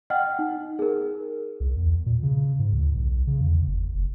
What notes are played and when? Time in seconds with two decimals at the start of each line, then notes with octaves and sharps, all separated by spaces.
0.10 D#5 F#5 G5 F6
0.39 D#4
0.79 G#4 A#4
1.60 C2
1.77 E2
2.06 A#2
2.23 C#3
2.59 G#2
2.72 D2
2.96 B1
3.27 C#3
3.41 E2
3.67 F#1
3.94 F1